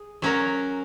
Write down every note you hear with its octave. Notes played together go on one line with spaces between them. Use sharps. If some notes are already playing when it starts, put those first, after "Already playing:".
Already playing: G#4
F#3 C#4 F#4 A#4